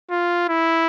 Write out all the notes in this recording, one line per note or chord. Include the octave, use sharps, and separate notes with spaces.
F4
E4